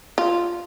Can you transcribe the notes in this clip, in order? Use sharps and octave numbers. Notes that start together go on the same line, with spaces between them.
F4